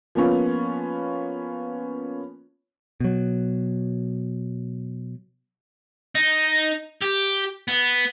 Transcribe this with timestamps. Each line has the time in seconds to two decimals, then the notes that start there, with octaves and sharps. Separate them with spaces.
0.15 F3 A#3 B3 C#4 F4
3.00 B2 F#3
6.15 D#4
7.01 G4
7.68 B3